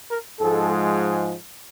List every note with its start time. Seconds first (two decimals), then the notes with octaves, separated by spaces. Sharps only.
0.09 A#4
0.39 G#2 F3 G#3 A4